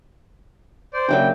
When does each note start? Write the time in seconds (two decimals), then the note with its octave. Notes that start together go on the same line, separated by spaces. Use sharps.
0.93 C5 D5
1.09 C#3 F#3 A#3 D4 D5 E5 G5